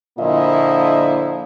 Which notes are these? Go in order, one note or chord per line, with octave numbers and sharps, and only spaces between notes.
A#2 D3 F3 A#3 E4 D#5